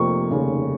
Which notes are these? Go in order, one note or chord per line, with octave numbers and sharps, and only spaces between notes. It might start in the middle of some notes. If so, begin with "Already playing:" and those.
Already playing: F1 F2 C3 F3 A#3 C#6
F1 D#2 C#3